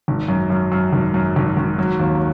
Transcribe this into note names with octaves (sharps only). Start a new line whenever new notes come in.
G#1
F#2
F#2
F#2
G#1
F#2
G#1
G#1
F#3
D#2